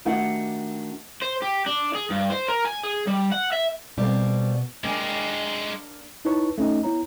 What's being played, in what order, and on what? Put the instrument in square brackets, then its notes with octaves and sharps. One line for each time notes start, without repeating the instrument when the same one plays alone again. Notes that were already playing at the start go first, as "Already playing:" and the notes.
[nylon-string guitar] D#3 A3 D4 F#4 G4 F#5
[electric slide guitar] C5
G4
D4
G#4
G2
C5
A#4
G#5
G#4
G3
F#5
E5
[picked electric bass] B2 [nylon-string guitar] G3 A#3 C4
[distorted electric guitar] G#3 G4 [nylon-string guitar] A#3 D4 G#5
[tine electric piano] D#4 E4 B4 C#5 A5 C#6
A3 C#4 D#4 D#5
B3 E4 C#5 A#5